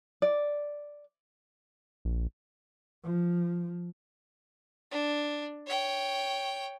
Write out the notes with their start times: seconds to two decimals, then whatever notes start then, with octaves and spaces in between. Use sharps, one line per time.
0.22 D5
2.05 A#1
3.04 F3
4.91 D4
5.67 C#5 G5